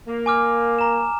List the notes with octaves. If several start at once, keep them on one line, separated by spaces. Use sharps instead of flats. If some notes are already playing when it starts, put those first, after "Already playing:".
A#3
G#5 D6 F6
A#5 E7